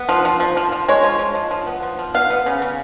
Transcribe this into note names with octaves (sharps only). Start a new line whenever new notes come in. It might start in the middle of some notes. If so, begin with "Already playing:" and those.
Already playing: B3
F3
F3
F3
F3
F3
G#3 C#5
F3
F3
F3
F3
B3
F3
F3
B3 F5
B3
C#3
C#3